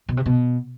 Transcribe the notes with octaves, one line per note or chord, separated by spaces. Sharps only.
B2
C3
B2